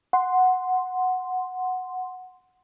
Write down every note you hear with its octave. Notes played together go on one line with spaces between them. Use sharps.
F#5 C6